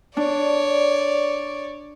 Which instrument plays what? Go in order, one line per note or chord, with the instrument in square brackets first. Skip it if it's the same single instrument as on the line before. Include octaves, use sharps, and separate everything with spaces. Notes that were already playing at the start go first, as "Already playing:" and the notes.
[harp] D4 [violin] C#5 D5